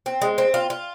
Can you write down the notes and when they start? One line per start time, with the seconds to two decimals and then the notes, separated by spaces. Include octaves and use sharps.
0.06 C4
0.22 G#3
0.38 C4
0.54 F4
0.70 F4